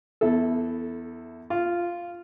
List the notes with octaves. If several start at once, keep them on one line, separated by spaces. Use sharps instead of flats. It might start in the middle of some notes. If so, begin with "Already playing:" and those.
E2 E4 A4
F4